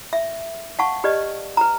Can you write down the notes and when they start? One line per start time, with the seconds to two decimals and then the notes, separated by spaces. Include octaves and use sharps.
0.13 E5
0.79 F5 F#5 A5 C#6
1.04 G4 B4 D5 D#5
1.57 B4 A#5